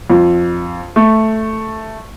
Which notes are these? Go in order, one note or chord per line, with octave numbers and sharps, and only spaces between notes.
F2
A3